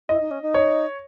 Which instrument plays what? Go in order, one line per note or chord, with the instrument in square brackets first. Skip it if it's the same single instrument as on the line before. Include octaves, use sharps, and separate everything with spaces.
[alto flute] E4 [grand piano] D#5
[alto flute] D#4
C#4
D#4
[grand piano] C#5